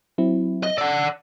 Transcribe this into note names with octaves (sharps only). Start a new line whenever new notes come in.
F#3 C4 E4
D#5
D5 F#5 E6